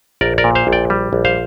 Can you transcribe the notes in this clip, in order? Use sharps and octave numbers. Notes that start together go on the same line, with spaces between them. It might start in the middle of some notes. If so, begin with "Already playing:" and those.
A#1 A#4 D5
A#4 D5
A#2
C5 F5
A#1
D5 G5
G3
A#1
C5 F5